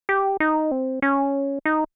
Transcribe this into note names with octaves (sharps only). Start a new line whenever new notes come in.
G4
D#4
C4
C#4
D#4